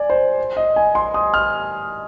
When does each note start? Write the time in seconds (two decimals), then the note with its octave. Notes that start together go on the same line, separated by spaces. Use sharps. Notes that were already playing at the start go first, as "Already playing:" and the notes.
Already playing: D5 G#5
0.10 C5
0.57 D#5
0.76 G#5
0.95 C6
1.14 D#6
1.34 F6